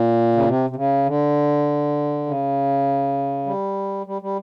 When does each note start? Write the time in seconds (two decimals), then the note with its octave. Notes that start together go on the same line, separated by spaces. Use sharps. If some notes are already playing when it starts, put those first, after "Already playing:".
Already playing: A#2
0.35 C#3
0.46 C3
0.70 C3
0.76 C#3
1.06 D3
2.26 C#3
3.46 G3
4.06 G3
4.22 G3